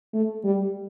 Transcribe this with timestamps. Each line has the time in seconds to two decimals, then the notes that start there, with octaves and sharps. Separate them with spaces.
0.13 A3
0.44 G3